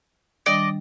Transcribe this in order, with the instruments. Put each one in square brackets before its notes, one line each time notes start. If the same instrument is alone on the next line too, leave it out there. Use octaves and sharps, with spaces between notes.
[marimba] D#3 G3 D4 [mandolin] D5 D#5